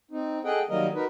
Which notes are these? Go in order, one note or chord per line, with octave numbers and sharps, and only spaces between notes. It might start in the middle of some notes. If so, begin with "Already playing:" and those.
C4 D#4
G#4 A4 D#5 F#5 G5
D#3 F#3 G3 A#3 A#4 D#5
D#4 F#4 A#4 B4